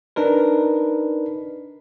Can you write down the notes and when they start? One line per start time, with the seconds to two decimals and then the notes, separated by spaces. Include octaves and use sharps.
0.16 D4 D#4 A#4 B4